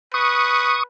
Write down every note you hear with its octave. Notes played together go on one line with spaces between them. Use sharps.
B4 C#6 D#6